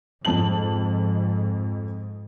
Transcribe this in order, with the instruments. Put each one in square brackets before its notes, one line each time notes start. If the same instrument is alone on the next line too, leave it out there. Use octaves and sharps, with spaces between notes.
[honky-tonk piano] F2 A5 F#7 [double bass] G#2